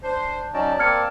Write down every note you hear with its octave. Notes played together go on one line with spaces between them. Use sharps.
D4 C5
F#3 C#4 D#4 D5 A5
A#3 C4 A#4 F6 G#6 C#7